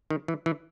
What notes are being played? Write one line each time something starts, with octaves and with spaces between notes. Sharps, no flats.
D#3
E3
E3